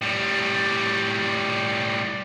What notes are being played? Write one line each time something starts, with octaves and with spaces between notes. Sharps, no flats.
A2 G3